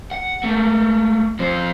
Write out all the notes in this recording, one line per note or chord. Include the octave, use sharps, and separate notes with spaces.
F#5
A3 A#3
F2 C5